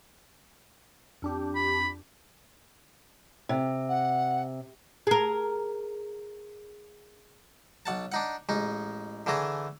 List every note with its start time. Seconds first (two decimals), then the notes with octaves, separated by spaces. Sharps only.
1.22 F2 D4 G4
1.55 B5
3.49 C3
3.88 F#5
5.07 G#4 A#4
7.86 B1 F#5 A5
8.12 D4 D#4 F#5
8.49 A1 G#3 D#4
9.26 D3 E3 A3 G#4 A#5